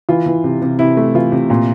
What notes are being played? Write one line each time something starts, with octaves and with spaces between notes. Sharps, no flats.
E3 F4
E3
C3
C3
C3 E4
A3
E3 F4
C3
A#2